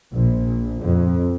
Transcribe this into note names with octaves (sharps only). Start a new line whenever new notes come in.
A#1
F2